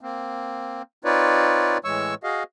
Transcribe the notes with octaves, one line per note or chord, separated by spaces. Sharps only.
A#3 C4
C4 D#4 F4 B4 C#5 D5
A2 E3 G#3 C#5 C#6 E6
F#4 G#4 D#5 F5